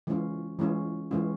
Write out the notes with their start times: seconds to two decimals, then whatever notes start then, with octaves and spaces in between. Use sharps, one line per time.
0.07 E3 G#3 C#4 F4
0.59 E3 G#3 C#4 F4
1.11 E3 G#3 C#4 F4